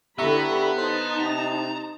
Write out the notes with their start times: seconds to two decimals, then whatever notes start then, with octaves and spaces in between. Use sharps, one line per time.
0.18 D3 B3 E4 G4 E5 A#5 B5 C#6
0.78 D#4 C5 A5
1.19 C3 A#5